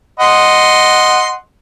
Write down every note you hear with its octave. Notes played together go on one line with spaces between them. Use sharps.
D#5 F#5 C6